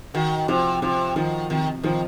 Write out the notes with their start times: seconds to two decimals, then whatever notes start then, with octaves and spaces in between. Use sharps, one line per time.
0.14 D#3 F#4
0.48 C3 F3
0.82 C3 F3
1.16 D#3 F3
1.50 C3 D#3
1.84 D#3 F3